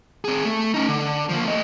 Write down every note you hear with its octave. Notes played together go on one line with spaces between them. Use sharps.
C4 G#4
A3
C#4 D#4
D3
F3 A#3
A3 D#5